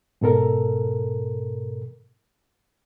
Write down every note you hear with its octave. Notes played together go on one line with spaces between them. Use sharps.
G#2 B2 A4 A#4